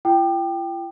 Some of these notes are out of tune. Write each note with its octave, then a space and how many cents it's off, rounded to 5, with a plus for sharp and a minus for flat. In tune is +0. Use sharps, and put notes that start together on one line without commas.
F4 -45 G5 +0 D6 +45